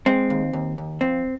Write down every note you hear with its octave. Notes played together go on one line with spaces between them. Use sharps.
G#3 C4
D#2
D#2
D#2
F2 C4